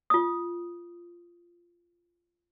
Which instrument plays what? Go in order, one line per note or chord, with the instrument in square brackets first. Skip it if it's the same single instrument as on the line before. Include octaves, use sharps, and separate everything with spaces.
[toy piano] F4 D#6